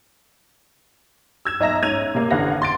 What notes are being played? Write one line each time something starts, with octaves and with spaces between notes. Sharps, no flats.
E6 G#6 E7
B1 D#5 E5 A#5 A#6 E7
G#2 C#4 G#6 D#7 F7
C3 A#3
A1 D3 B4 F5 F#5 A#6
C6 A6 D7